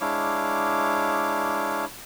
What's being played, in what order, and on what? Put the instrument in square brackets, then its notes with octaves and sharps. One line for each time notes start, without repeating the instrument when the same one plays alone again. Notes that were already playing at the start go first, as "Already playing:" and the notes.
[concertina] G#3 D4 E4 C#5 F5 D6